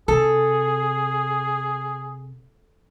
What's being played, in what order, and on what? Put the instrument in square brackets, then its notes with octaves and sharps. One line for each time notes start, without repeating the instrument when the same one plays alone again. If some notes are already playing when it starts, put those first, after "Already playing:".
[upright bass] C3 [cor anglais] G#4 [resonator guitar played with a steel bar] A4